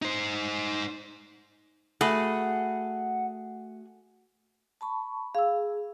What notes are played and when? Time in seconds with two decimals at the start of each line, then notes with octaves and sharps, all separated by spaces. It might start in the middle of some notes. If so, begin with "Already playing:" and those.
0.02 D#4 C5
2.01 A3 F#4 G#4 F#5 B5
4.81 A5 B5 C#6
5.35 G#4 F5 E6